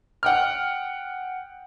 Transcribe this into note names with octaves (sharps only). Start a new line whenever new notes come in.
F#5 G5 F6